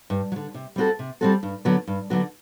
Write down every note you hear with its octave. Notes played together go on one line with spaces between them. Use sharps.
G2
F#3
D3
C3
G3 C4 F#4 A4
C3
G3 C4 F#4 A4
G2
D3 F#3 B3 F#4
G2
D3 F#3 B3 F#4